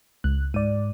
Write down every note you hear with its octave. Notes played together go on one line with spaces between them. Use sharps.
C#2 F#6
G#2 D5 D#7